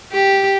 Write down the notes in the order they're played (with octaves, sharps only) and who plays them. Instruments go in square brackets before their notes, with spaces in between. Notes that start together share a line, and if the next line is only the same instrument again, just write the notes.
[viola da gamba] G4